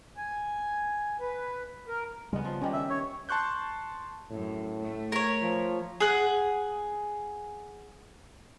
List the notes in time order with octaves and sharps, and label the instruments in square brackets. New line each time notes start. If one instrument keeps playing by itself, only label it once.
[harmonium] G#5
B4
A#4
[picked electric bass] C#3 G3 [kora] G#3 B3
[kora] F3
[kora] G2 D#3 G4 [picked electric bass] C#4
[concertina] E5
C#5
[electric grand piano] A5 C6 C#6 F#6 G6
[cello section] F#2 [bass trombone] A2
[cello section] A3
[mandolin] A#4 C#5
[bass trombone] F3
[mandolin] G#4 F#5